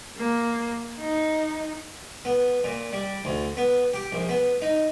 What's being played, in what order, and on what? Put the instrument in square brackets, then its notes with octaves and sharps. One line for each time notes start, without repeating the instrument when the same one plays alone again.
[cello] A#3
D#4
[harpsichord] B3
A#2
G3
D2
B3
G4
A#1
B3
D#4